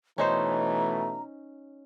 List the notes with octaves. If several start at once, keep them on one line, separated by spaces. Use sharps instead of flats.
B2 E3 A3 C#4 D#4 C5 A#5